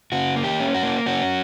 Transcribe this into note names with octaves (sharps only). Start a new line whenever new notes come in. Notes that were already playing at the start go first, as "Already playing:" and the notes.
C#3 F#4
A#3
G4
C#4
F#4
A#3
C#4 F#4